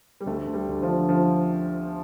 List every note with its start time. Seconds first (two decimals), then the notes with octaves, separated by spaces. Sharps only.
0.21 G3
0.26 D2 A3
0.48 D2
0.54 G3
0.69 D2
0.82 F3
0.89 D3
1.09 D3 F3